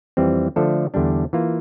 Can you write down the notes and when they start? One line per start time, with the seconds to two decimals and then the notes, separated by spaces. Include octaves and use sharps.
0.17 F2 E3 G3 C4
0.56 D3 F3 A3 D4 A4
0.94 E2 D3 G3 D4
1.33 E3 A#3 F4